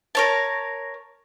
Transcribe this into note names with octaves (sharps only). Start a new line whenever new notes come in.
A#4 C#5 A5